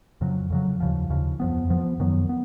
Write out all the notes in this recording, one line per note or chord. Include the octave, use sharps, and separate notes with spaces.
F2 C#3 F#3
F2 C#3 F#3
D#2 C#3 F3
D#2 C#3 F3
F2 F3 B3
F2 F3 B3
F#2 D#3 F#3 B3
B3